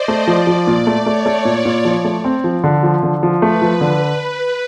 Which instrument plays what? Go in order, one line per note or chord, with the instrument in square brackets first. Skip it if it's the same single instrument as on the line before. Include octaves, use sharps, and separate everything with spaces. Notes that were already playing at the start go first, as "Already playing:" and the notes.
Already playing: [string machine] C5 D5 D#5
[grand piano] A3
[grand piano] F3 [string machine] D5
[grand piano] F3
A#2
A3
[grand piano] A3 [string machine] C#5
[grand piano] A3
A#2
A#2
F3
A3
C4
F3
D3
F3
D3
F3
[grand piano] A3 [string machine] B4
[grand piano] F3
D3